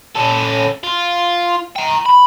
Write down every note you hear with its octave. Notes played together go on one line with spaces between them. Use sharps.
C#4 A4
F4
G5 A#5
B5